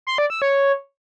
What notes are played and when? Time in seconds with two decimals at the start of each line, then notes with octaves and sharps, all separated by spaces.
0.07 C6
0.18 D5
0.30 E6
0.42 C#5